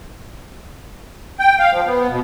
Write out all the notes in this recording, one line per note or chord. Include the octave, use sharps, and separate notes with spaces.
G5
F5
F3
B3
B2